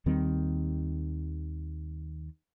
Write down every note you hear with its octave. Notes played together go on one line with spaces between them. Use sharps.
D#2 D#3 G3 C4